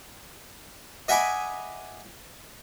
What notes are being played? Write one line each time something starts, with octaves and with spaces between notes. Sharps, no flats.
D#5 E5 F#5 G#5 B5 D6